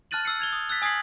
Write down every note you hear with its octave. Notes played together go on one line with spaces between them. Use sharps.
A5 F6 F#6 A6 D#7 F#7
E6 C7 C#7
G#6 F7 G7
D#6
E6 F#6 A6 B6
G#5 D#6 G#6 B6 C7 F#7